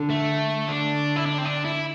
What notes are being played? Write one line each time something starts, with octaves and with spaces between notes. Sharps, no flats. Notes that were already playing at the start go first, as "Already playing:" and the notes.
Already playing: D3
A3
D3 D4
E4
D4
C4
D4
E4